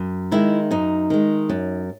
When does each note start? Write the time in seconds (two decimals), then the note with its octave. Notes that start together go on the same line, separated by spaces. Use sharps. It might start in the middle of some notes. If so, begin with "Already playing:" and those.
Already playing: F#2
0.32 D#3 G#3 E4
0.71 F#2 D#4
1.10 D#3 G#3
1.50 F#2